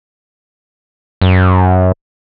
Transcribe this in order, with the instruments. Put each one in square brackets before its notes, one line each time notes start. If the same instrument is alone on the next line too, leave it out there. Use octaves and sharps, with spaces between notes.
[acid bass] F#2